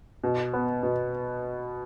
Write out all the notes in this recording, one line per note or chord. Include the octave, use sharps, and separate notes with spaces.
B2
B3
B2